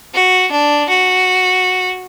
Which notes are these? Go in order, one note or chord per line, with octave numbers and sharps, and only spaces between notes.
F#4
D4
F#4